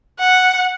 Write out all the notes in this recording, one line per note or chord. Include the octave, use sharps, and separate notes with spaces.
F#5